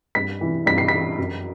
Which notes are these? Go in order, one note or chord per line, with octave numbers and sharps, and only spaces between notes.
G2 B6
E3
G2 B6
C7
E3 B6
F#2